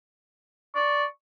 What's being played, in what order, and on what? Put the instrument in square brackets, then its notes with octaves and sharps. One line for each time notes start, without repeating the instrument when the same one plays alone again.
[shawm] D5 [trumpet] C#6